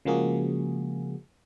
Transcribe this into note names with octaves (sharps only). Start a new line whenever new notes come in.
C#3 F3 G#3 A#3 F#4 G#4